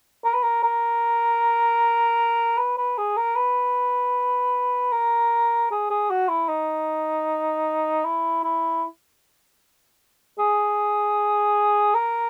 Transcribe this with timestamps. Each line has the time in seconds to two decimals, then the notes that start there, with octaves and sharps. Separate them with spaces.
0.24 A#4
0.34 B4
0.43 A#4
0.63 A#4
2.58 B4
2.78 B4
2.98 G#4
3.17 A#4
3.36 B4
4.93 A#4
5.71 G#4
5.90 G#4
6.10 F#4
6.29 E4
6.49 D#4
8.05 E4
8.44 E4
10.39 G#4
11.95 A#4